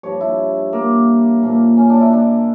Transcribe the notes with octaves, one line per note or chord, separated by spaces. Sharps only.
G2 F3 C#5
E4
A#3
A#2 F3
C#4
D4
E4
D4